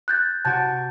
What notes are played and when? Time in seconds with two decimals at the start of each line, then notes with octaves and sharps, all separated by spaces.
0.08 F#6 G6 A6
0.45 C3 F#4 A5 G6 A6 D7